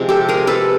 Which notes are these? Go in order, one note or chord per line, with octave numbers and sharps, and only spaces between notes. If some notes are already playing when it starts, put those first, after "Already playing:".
Already playing: C3 F3 G#3
G4 A4
G#4 A#4
A4 B4